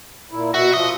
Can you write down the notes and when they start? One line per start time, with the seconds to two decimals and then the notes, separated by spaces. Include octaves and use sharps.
0.31 A#2 E4
0.54 B2 F#4 E5
0.74 F3 D#5